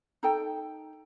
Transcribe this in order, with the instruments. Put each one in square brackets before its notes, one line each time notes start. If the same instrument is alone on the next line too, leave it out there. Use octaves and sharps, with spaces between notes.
[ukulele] D#4 A4 G5